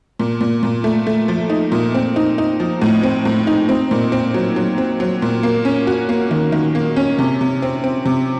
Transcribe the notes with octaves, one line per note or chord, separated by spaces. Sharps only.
A#2
A#2
A#2
A3
A3
F3
D#4
A#2
C4
D#4
D#4
F3
A2
C4
A2
D#4
C4
A#2
C4
F#3
F#3
C4
F#3
A#2
A#3
C#4
F#4
A#3
D#3
D#3
A#3
C#4
C3
C3
C4
C4
C3